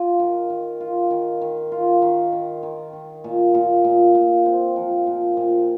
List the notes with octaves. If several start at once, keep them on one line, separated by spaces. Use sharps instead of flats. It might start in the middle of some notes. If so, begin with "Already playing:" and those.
Already playing: F4
D#3
D#3
F4
D#3
D#3
F4
D#3
D#3
D#3
D#3
A#2
A#2
A#2
A#2
C4
F3
A#2
A#2